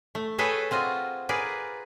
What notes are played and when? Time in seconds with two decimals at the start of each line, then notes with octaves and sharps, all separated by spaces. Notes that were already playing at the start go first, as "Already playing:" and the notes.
0.15 A3
0.38 G#4 A4 B4 C#5 E5 G5
0.71 C4 F4 F#4 D#5
1.29 G#4 A#4 B4 D5